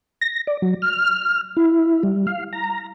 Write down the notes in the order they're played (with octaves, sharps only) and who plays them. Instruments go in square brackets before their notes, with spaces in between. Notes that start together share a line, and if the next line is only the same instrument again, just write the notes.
[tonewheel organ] A#6
D5
F#3
F6
E4
G3
F5
A#5